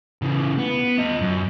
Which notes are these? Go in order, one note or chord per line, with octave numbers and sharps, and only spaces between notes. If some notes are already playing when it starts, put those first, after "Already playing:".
C#3 E3
B3
F4 D#5
F#2